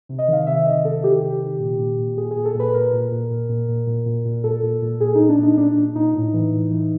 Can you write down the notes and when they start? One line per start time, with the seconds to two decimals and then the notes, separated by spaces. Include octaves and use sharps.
0.09 C3
0.19 D#5
0.28 D#3 F5
0.47 C3 E5
0.65 D#3 D#5
0.85 C3 A4
1.04 D#3 G4
1.22 C3
1.41 D#3
1.60 A#2
1.79 A#2
1.98 A#2
2.17 A#2 G#4
2.31 G#4
2.36 A#2
2.45 A4
2.55 A#2 B4
2.74 A#2 A#4
2.93 A#2
3.11 A#2
3.30 A#2
3.49 A#2
3.69 A#2
3.87 A#2
4.06 A#2
4.25 A#2
4.43 A#2 A4
4.63 A#2
4.82 A#2
5.00 A#2 G#4
5.15 A#2 D#4
5.29 D4
5.39 A#2 D#4
5.57 A#2 D4
5.76 A#2
5.95 A#2 D#4
6.14 A2
6.33 E3
6.52 A2
6.71 E3